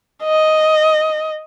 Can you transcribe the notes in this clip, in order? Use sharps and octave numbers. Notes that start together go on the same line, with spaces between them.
D#5